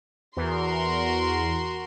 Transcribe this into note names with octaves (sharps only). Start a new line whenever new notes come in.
E2 F#4 A#4 C6